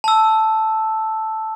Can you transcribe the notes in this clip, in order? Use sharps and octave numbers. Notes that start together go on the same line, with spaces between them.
A5 E6